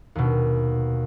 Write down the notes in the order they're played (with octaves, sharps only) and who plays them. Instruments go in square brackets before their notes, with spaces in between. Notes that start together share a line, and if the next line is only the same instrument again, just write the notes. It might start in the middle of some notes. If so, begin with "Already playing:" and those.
[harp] D#2 B2